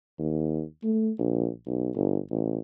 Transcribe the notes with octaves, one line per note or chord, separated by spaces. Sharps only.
D#2
A3
A#1
B1
G1
A1